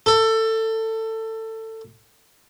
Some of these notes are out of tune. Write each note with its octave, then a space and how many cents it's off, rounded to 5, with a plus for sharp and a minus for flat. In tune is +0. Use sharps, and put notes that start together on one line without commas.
A4 +20